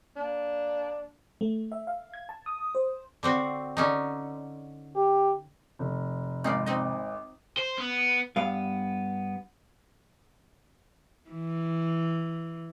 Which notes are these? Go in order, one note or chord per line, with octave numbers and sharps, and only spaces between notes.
A#3 D4
A3
E5
F5
G#6
A5
D#6
C5
D3 C4 F#4
D3 C#4 D#4
G4
F1
G#1 D#4 F4 D5
C4 D#4 D#5
C5
B3
G2 B3 F5
E3